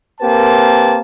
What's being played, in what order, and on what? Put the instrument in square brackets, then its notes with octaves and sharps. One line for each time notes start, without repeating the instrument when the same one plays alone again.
[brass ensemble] A#3 C4 G4 A#4 B4 A5